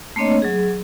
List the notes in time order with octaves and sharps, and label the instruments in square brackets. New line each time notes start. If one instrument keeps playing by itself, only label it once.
[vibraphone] A3 A#3 C4 D4 C#5 D#5
F#3 G#4